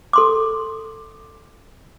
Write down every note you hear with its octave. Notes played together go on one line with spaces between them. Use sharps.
A4 C6 D6